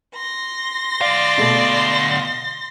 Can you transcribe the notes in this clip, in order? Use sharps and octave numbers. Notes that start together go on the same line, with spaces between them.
C6 A#6
D3 D5 F5
B2 A3